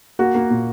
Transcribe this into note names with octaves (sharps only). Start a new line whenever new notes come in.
A#3 F#4
A#3
A#2